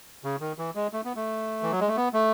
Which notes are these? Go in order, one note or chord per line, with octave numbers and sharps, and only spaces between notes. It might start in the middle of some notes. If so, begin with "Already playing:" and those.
C#3
D#3
E3
G#3
A3
B3
A3
E3
F#3
G#3
A3
B3
A3